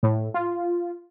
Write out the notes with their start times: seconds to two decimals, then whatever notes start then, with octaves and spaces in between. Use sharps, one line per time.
0.03 A2
0.34 F4